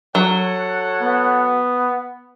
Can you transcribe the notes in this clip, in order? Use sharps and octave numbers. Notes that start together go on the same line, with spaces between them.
F#3 A4 C#5 F#5
B3